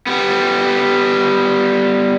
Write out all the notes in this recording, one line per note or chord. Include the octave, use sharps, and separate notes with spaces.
G3 B3